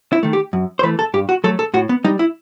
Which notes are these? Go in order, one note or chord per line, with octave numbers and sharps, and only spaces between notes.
E4
D#3 A3
G4
F#2
C5
E3 A3 B4
A4
G2 G4
F#4
F#3 A3 A4
A4
A2 F#4
B3
G3 D#4
E4